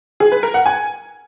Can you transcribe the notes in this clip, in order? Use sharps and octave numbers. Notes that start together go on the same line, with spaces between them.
G#4
B4
A#4
F#5
G#5